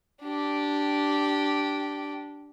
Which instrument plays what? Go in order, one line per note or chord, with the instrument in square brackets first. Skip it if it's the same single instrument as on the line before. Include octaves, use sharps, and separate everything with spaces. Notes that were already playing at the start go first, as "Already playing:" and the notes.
[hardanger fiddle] D4 G4